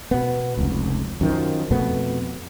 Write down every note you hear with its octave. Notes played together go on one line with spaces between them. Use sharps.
B2 B3
F1 C#2
F#2 D#3 F3
F2 B2 A3 B3